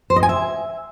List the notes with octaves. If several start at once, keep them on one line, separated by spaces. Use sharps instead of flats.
C5
D#5
G#5
E5